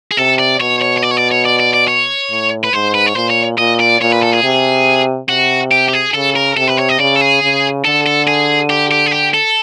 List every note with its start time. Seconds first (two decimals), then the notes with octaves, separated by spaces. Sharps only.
0.11 G#4
0.17 C3 A4
0.39 D5
0.60 B2 C#5
0.81 C#5
0.97 C#5
1.02 D5
1.11 C#5
1.17 D5
1.31 C#5
1.45 D5
1.60 D5
1.74 D5
1.88 C#5
2.31 A2
2.64 B4
2.73 G#2 C5
2.95 B4
3.07 C#5
3.16 A#2 C5
3.30 C#5
3.58 A#2 D#5
3.80 D5
4.01 A#2 C#5
4.12 B4
4.22 A4
4.33 G#4
4.44 C3
5.29 C3 F#4
5.71 G4
5.89 G4
5.93 G#4
6.14 C#3 A4
6.36 A#4
6.57 C3 A4
6.67 B4
6.79 C#5
6.89 D#5
7.00 C#3 D5
7.15 A4
7.21 G#4
7.43 C#3
7.85 D3 A4
8.07 A4
8.28 G#4
8.70 G4
8.92 G4
9.06 G#4
9.13 G4
9.34 A4